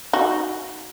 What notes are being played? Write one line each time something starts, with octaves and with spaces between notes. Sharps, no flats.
D#4 F#4